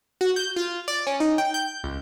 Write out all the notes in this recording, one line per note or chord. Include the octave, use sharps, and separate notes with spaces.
F#4
G6
F4
D5
C#4
D#4
G5
G6
C#2